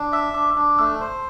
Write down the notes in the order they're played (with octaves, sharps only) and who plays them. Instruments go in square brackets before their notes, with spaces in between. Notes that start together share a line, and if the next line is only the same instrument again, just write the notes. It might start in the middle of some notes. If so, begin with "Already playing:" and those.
Already playing: [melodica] D4
[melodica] E5 [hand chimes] E6
[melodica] D4 [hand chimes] D6
[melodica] D4 [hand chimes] D6
[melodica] A3 [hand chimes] E6
[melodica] C5